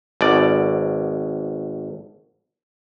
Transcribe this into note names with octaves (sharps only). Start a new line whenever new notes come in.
G#1 B2 D5